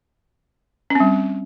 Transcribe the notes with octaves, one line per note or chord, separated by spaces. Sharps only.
G3 C4 C#4